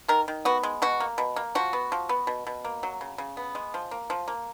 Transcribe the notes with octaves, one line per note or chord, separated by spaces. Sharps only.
D#3 A#4
D#3
B3 F#4
G#3
B2 F#4
A#3
B2
A#3
F3 F#4
B3
F3
B3
B2
B2
A#3
F#3
C#3
C#3
B3
G#3
F3
A#3
F3
A#3